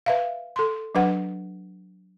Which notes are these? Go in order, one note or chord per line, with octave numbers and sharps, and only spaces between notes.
B4 E5 F5
A4 C6
F#3 D4 B4 F#5